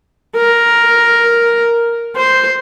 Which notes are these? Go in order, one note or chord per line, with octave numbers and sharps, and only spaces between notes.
A#4
C5